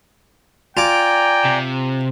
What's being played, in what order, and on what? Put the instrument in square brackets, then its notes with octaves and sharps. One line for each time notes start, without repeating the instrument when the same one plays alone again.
[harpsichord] F4 D6 [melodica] D5 G#5 A#5 [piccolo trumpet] G5
[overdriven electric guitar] C3